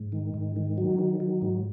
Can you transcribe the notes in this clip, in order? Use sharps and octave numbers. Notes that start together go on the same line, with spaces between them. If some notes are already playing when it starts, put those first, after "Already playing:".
Already playing: G#2
D#3
G#2
D#3
F#3
D#3
F#3
G#2